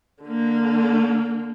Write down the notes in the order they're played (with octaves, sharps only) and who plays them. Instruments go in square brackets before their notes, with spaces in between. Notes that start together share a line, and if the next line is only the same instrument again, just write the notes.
[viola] D3 A#3